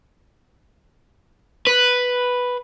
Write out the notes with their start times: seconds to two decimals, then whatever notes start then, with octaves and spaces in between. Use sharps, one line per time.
1.67 B4